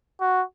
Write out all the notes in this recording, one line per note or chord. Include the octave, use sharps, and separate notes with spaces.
F#4